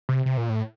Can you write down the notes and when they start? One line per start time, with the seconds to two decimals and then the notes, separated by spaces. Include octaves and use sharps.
0.09 C3
0.26 C3
0.37 A#2
0.50 A2